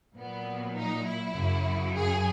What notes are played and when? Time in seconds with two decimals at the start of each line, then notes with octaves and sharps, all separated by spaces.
0.16 A#2 F#3 B3
0.75 D#4
1.05 E4
1.34 F#2 C#3 F#3
1.94 G#4